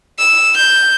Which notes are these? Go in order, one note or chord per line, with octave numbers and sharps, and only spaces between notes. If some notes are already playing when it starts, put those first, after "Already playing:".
E6
G6